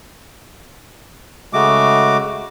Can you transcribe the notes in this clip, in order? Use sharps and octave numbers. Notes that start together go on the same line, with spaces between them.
C#3 G#3 A3 F#4 D6